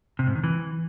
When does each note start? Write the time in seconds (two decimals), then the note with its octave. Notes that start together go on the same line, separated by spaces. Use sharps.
0.19 C3
0.27 G#2
0.35 D#3
0.44 E3